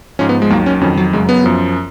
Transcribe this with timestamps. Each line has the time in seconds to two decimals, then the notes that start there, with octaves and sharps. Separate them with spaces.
0.19 G#2 F3 C#4
0.29 B3
0.42 G#3
0.50 D#2 D#3 F#3 A#3
0.66 C#4
0.81 F2 D#3 F#3 C#4
0.97 F#3
1.13 F#2 C#3 F#3 G#3
1.29 B3
1.44 F#2 F3